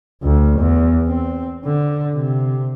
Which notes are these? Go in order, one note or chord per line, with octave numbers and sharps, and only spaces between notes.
D2
E2
C4
D3
C3